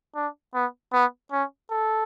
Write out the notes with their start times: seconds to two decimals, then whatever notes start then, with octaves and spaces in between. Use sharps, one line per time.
0.15 D4
0.54 B3
0.93 B3
1.32 C#4
1.71 A4